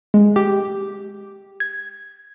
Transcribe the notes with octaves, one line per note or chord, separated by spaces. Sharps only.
G#3
G4
G#6